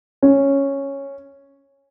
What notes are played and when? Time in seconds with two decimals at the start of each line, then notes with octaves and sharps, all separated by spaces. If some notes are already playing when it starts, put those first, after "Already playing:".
0.22 C#4